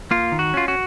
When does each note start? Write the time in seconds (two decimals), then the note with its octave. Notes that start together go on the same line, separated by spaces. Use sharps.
0.11 A#3 F4
0.32 D#3
0.39 F#4
0.54 C#4 F4
0.68 F#4